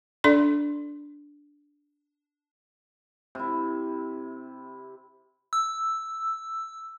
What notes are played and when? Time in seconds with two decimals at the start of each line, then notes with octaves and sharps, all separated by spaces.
0.24 D4 A4 D5 C6
3.35 C3 E4
5.53 E6